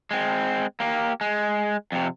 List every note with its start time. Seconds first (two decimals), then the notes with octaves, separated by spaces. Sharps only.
0.11 G#3 C4
0.80 A#3 G4
1.21 G#3
1.92 F2 C3